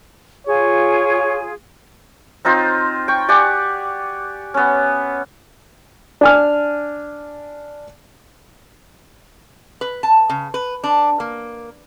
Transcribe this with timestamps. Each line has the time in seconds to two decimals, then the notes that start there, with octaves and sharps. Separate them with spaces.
0.47 F4 G#4 C#5
2.45 C4 D#4 F4 C5
3.08 G5 C#6
3.28 G4 D5 F#5 G#5
4.54 B3 C#4
6.21 D4 G#5 F6
9.81 B4
10.03 A5
10.29 C#3
10.54 B4
10.84 D4
11.20 A#3